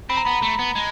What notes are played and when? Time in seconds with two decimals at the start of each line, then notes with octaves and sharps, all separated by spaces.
0.09 C4 B5
0.17 A#5
0.25 B3 B5
0.42 A3
0.59 B3
0.75 G#3